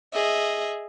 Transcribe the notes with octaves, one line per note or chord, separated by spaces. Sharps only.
G#4 D#5 E5